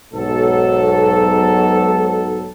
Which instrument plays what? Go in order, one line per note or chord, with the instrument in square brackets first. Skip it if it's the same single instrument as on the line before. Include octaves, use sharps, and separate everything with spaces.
[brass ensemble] B1 G#2 F#3 A4